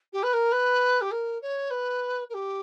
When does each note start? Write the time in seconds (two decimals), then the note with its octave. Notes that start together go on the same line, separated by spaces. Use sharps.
0.12 G4
0.22 B4
0.33 A#4
0.51 B4
1.01 G4
1.11 A#4
1.41 C#5
1.70 B4
2.29 A#4
2.33 G4